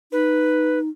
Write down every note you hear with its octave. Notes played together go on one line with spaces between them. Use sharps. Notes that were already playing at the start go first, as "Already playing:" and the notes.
D#4 B4